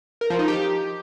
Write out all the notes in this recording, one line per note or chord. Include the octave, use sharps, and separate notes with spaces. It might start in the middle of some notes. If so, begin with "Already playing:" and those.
A#4
F3
D#4
G4